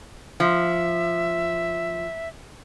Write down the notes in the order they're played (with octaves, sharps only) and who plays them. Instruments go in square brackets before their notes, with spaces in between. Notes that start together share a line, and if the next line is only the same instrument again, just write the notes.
[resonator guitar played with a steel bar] F3 [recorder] E5